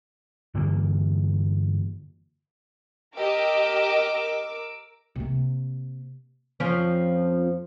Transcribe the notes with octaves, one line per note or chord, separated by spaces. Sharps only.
G2 D3 E3 A#3
G4 A#4 D#5 D6 E6
C3 A#3
F2 F3 C#4